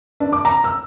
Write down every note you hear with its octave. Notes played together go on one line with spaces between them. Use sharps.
D4
D6
A#5
E6